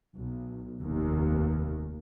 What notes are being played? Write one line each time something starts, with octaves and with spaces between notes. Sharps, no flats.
B1
F1 D#2